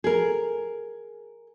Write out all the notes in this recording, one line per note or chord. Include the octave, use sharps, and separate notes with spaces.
G#4 A#4